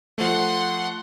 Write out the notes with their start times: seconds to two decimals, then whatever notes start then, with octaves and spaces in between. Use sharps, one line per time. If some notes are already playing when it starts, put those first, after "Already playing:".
0.18 F3 A3 F#5 C6